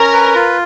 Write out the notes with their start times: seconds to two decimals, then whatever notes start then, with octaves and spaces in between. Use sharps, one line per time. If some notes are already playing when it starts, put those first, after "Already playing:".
Already playing: C#4 A#4
0.13 B4
0.35 F4